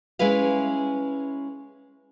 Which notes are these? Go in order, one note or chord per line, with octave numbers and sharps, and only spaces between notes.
G#3 C#4 E4 B4 F5